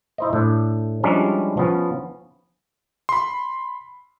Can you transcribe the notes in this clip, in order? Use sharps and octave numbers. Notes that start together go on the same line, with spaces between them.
E4 C5 D#5
A2 D4
F3 G3 G#3 C#4 D4 E4
F3 B3 C#4
B5 C6